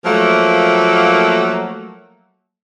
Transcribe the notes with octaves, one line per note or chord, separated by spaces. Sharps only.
F3 F#3 A3 A#3